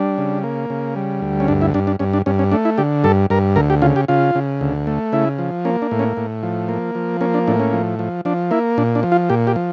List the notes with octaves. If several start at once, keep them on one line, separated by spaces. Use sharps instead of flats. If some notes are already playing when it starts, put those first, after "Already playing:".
Already playing: G3 D4
C#3
A#3
C#3
G3
D2
C#4
G2 D4
E4
G2 D4
D4
G2 C#4
D4
G2 C#4
C#4
A3 D4
E4
D3 G4
G2 A4
G2 A#4
D2 A#4
G4
C#3 F4
G4
C#3 F4
C#3
D2
A3
C#3 E4
F3
A#3 C#4
D4
A2
C#4
A2
F3
A#3
F3
A#3 C#4
D4
A2 D4
C#4
F3
F3
F3 D4
A#3 E4
A#2 D4
D4
F3
F4
A#2 G4
G4
F3